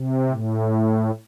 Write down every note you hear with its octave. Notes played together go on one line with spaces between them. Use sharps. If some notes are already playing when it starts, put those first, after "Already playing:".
Already playing: C3
A2